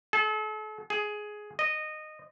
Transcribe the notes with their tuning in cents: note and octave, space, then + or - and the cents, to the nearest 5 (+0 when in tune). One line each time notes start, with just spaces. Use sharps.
A4 -40
G#4 +10
D#5 -15